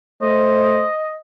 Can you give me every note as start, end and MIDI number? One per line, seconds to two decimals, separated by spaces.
0.22 0.85 57
0.22 0.90 72
0.22 1.16 75